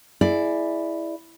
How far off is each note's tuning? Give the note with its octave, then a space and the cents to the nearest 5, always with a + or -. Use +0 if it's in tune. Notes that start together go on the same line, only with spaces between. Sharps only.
E4 +0 G#4 +15 D5 +15